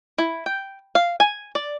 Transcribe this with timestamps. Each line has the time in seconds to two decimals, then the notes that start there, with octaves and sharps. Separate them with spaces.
0.18 E4
0.46 G5
0.95 F5
1.20 G#5
1.55 D5